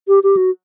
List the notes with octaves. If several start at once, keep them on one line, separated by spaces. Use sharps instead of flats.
G4
G4
F#4